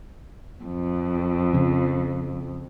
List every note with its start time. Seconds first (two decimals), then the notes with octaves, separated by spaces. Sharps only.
0.63 F2
1.53 C#3 F3